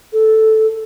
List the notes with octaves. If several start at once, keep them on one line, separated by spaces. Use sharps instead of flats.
A4